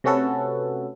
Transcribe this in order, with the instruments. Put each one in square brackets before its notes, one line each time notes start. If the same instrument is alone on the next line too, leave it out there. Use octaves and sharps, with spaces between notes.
[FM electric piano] C3 A3 C#4 F#4 A4 B4